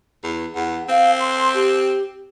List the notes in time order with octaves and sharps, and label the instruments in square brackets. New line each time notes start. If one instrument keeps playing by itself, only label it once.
[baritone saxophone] E2
[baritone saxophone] E2 [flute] F#5
[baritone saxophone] C4 [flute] F5
[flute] C6
G4